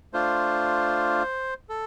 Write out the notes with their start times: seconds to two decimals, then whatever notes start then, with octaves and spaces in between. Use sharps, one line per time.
0.13 A3 D4 F4 C5
1.69 A4